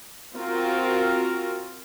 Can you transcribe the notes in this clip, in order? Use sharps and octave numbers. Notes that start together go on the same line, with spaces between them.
C4 F4 F#4 A#4